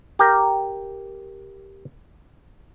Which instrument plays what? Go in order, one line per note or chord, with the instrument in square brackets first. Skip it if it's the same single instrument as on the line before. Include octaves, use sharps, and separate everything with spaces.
[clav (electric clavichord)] G4 A#4